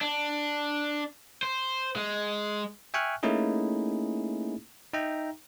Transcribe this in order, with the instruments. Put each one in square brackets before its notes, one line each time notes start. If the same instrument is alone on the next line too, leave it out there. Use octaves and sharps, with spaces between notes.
[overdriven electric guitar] D4
C5
G#3
[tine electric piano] E5 G5 G#5 C#6 F6 F#6
A3 A#3 C#4 D#4 E4 G#4
D#4 E5 G5 A#5